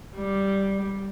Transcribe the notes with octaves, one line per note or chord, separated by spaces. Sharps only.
G3